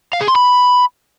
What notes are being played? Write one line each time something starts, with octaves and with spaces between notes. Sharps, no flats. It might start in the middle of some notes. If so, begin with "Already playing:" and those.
F5
G#4
C6
B5